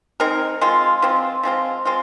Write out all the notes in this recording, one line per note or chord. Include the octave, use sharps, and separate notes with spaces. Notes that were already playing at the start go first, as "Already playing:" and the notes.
G#3 C4 D#4 A#4
F3 G#3 C4 F4
F3 G#3 C4 F4
F3 G#3 C4 F4
G#3 C4 F4